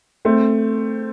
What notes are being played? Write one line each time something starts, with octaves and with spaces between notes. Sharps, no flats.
A3 C4